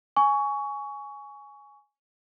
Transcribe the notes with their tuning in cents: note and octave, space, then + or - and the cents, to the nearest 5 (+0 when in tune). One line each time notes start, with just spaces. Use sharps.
G#5 +0 C#6 +20